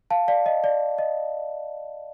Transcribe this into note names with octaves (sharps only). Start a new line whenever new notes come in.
F5 A5
D5 F5
D#5
D5
D#5